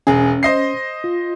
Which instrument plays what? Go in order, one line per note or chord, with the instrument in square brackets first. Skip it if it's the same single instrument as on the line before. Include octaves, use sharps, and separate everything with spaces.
[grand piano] E1 G#4 [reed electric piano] C#4
[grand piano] C5 D#5 C7
[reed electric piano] F4